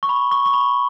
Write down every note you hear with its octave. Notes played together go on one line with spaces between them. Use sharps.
C#6
B5
C#6
C#6
B5